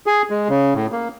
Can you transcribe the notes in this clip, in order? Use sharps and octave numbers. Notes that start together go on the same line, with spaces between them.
G#4
G#3
C#3
A2
A#3